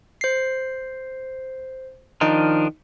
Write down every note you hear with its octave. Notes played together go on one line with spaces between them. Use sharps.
C5 C7
D#3 F3 D4 D#4